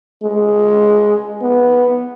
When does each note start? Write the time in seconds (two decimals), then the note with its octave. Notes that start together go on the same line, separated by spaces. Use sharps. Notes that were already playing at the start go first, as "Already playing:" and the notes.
0.23 G#3
1.41 B3